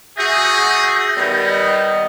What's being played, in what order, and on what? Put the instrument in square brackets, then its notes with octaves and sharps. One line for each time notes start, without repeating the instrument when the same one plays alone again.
[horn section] F#4 G#4 [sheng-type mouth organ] E5 D#6 [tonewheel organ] G6 A#6
[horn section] D#3 G3 B3
[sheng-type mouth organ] D#5